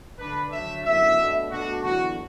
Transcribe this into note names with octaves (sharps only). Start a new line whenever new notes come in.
D3 A3 D4 B4
D3 F#3 A3 D4 E5
F#2 D3 B3 E4 E5
B2 A3 D4
B2 A3 D4 F#4
E2 D3 F#3 B3 E4 F#4